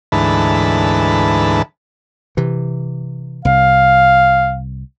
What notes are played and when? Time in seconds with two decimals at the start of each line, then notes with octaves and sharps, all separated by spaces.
0.12 D2 G#2 E3 B4 A5
2.37 C3 E3
3.45 C2 F5